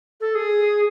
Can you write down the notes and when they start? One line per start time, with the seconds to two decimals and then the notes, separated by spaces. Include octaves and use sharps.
0.21 A4
0.35 G#4